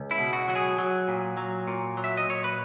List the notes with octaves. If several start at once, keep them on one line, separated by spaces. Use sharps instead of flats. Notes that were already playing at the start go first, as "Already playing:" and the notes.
Already playing: C#2
E4
B2
F#4
F#3 F#4
G#4
F#3
A#2
F#3
A#2
F#3
E5
D#5
A#2 C#5
B4